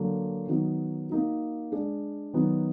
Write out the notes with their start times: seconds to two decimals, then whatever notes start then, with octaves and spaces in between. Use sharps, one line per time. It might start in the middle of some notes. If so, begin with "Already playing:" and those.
Already playing: D3 F#3 A#3
0.48 D#3 F#3 B3 D#4 F#4
1.10 A#3 D#4 F#4
1.72 G#3 D4 G#4 D5
2.34 D#3 F#3 B3 D#4